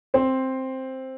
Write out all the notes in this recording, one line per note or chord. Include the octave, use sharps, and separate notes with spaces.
C4 C5